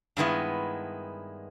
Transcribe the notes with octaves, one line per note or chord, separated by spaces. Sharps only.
G2 D#3 G#3 B3 E4